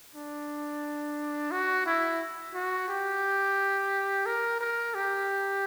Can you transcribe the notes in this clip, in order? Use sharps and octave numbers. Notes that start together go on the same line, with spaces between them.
D4
F#4
E4
F#4
G4
A#4
A#4
G4